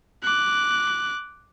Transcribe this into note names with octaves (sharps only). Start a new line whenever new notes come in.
D6 F#6